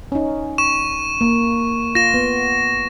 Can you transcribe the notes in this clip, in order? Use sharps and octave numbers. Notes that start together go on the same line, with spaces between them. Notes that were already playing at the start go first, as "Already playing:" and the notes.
C#4 D#4
C#6 E7
A#3
F4 A#6 E7
B3